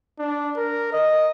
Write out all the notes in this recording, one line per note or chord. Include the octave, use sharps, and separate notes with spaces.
D4
A#4
D#5